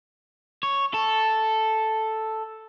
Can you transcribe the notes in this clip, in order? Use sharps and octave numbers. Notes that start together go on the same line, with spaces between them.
C#5
A4